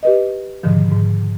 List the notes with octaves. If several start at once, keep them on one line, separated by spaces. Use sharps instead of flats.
G4 B4 D#5
G#2 B2 D3 D#3 F3
G#2